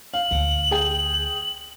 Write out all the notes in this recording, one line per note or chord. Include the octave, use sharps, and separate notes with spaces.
F5 F#7
D2
G#4 G5